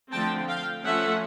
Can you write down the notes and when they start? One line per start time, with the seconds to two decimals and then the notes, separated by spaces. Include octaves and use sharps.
0.12 D3 F3 A3 C4 G5 A5
0.48 F5 G5
0.84 F3 A3 C#4 E5 F#5